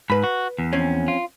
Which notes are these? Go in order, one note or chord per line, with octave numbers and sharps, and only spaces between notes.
G#2 B4 B5
F#4
E2
F2 C4 C#4
F4